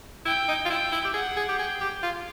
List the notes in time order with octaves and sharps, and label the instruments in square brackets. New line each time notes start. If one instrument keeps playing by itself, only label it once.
[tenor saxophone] E4 [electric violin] G5
[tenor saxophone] D#4
F4
[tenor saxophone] E4 [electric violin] G5
[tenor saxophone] E4
G4
[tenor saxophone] G#4 [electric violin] F#5
[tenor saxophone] G#4
G4
[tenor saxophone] G#4 [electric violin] G5
[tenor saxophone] G4
F4